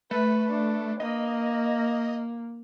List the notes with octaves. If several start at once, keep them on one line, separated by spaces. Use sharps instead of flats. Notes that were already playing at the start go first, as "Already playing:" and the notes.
A3 B4
D4
A#3 D#5